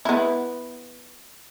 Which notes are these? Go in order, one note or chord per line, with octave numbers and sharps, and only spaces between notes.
B3 E4